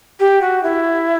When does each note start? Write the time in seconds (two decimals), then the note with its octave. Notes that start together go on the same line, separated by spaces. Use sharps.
0.20 G4
0.41 F#4
0.63 E4